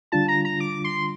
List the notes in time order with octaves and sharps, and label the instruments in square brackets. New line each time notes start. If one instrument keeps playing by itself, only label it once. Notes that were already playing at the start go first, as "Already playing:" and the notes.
[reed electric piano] D3 G3 D4 F4 [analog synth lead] A5
[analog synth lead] A#5
A#5
D6
C6